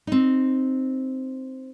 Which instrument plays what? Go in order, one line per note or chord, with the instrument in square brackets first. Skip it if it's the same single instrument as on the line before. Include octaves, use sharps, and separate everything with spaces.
[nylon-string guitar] C4 D#4